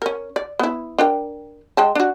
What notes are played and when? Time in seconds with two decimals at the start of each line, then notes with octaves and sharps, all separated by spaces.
0.02 C#4 A#4
0.36 D5
0.59 B3 E4
0.99 D4 A#4 G5
1.77 G#3 G5 A5
1.95 D4 F#4